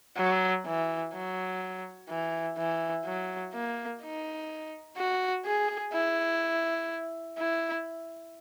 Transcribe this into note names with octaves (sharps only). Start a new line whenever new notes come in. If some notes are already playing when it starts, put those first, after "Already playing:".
F#3
E3
F#3
E3
E3
F#3
A#3
D#4
F#4
G#4
E4
E4